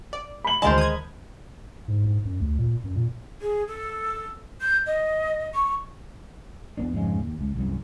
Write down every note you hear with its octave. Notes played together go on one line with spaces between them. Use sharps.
D5
B5 F#7
D2 D#3 G#3 A#4 C5 A5
D#6 G#6
G#2
G#2
F#2
D2
A#2
F#2
A#2
G#4
A4
G6
D#5
C#6
E2 B3 D4
F2 G#2 C#3 G#3
D#2
C#2
C2 F#2